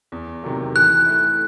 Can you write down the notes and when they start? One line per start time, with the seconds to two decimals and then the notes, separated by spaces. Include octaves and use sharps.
0.12 E2
0.43 C3 D#3 F#3 A3
0.75 E3 F#6
1.06 A3 E4